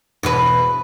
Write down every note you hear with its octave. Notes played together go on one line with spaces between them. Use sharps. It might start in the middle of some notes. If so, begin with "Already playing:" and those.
E2 B2 B4